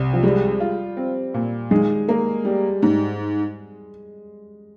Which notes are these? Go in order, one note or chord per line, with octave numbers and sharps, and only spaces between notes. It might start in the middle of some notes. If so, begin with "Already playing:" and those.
Already playing: C2
F3
G3 G#3
F4
C4
A#2
D#3 G#3
A#3
G3
G#2